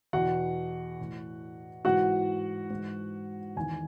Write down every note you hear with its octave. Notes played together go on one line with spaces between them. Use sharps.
E2 B2 F#4 F#5
A2 E3
G#2 E3 F#4 F#5
G#2
E3
E2 D#3 G#5